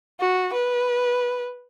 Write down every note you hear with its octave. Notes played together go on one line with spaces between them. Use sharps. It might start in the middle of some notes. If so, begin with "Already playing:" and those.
F#4
B4